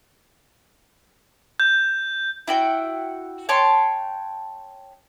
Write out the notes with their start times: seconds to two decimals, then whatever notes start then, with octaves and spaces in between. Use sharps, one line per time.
1.60 G6
2.48 E4 F#4 G5
3.49 C#5 G5 A5 C6